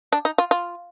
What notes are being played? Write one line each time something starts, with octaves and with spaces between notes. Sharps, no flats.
D4
D#4
F4
F4